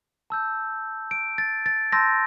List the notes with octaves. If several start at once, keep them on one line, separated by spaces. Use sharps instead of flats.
A5 E6 G6
D7
A6
A6
A5 C6 E6 G6 A#6